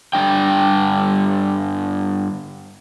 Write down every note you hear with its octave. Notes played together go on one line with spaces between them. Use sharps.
G2 D3 F3 D4 G5